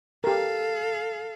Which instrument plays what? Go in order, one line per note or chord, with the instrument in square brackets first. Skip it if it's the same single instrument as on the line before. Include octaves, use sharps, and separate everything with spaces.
[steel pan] G4 A#4 [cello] A4 F5